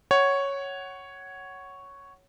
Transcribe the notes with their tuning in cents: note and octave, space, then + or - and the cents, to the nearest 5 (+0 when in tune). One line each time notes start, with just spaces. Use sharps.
C#5 +0 F#5 +15